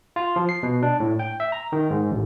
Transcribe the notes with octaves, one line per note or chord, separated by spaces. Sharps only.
F4
F3
C7
B2
D4
A2
G5
E5
A#5
D#3
G#2
A1